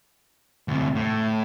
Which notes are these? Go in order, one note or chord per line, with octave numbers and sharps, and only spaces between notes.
D2 C3
A2